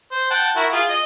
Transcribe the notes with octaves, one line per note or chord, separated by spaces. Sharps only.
C5
F#5 G5 A5
E4 F#4 A#4
F4 G#4
D#5